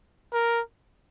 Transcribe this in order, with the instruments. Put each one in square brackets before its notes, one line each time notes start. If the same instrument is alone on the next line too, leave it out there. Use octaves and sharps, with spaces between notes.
[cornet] A#4